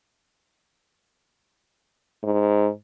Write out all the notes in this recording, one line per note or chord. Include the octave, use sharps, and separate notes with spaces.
G#2